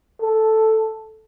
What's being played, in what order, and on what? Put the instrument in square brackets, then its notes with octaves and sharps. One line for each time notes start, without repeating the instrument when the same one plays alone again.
[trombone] A4